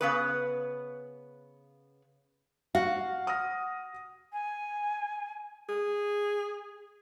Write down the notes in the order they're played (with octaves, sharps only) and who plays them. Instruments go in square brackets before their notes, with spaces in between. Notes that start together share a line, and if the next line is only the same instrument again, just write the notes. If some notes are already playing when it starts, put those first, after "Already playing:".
[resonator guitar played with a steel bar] C#3 B3 B4
[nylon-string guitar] F#4 [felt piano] F5
[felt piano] D#6 F6 A#6
[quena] G#5
[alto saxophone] G#4